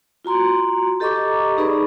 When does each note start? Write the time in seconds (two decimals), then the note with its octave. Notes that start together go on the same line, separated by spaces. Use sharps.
0.25 F4 F#4 A#5 C6
1.00 G4 A4 D#5 A#5 C#6 D6
1.57 D#4 G#4 B4 D5 B5 C#6